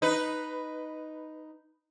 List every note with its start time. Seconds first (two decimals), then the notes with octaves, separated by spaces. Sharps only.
0.02 D#4 B4